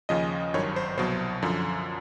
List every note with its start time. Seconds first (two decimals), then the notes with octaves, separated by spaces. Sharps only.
0.09 D#2 C#3 F3 D#5
0.54 G#1 G2 D#3 F#3 C#5
0.76 C5
0.98 C2 B2 F#3 C5
1.42 F#2 D3 F3